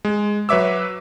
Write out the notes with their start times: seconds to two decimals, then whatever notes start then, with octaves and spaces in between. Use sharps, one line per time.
0.05 G#3
0.49 F#3 B4 C#5 E5 D6 E6